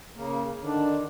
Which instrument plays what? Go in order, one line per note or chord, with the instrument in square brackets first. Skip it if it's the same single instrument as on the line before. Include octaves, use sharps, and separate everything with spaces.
[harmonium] C#3 A#3
[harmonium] D3 D#3 [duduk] D4